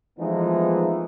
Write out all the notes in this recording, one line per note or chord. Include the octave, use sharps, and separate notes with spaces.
E3 F3 G#3 A3 B3 D#4